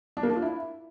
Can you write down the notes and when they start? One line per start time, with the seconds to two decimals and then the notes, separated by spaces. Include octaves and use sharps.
0.17 D4
0.23 A#3
0.29 D4
0.36 F4
0.42 E4